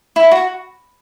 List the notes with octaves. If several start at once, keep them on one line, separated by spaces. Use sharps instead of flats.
E4
F#4